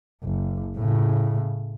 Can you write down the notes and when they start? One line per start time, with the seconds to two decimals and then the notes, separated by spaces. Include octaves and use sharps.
0.24 F#1
0.78 A2 C#3